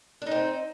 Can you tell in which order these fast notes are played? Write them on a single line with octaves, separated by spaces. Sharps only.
D4 D#4 C4